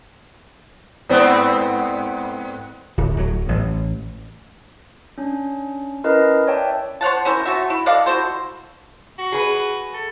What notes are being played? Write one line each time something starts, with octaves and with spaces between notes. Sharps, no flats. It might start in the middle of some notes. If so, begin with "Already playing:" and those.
G#2 B3 C4
D1
D1 F#3
A1 A2
C#4 D4
C#4 E4 A#4 B4 D#5
C#5 D5 E5 G5 A5
C5 C#5 F#5 A5
C#4 E4 A#4 C5
A3 F#4 E5
E4
A4 D5 D#5 F5
E4 F#4 A4 C5
F#4
G#4 B4
A4